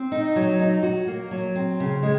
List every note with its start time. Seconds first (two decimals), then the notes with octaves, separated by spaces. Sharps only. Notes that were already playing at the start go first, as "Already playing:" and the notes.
Already playing: C4
0.12 D#4
0.36 F#3
0.59 D#4
0.83 F#4
1.07 A#3
1.31 F#3
1.55 C4
1.80 C#3
2.03 G#3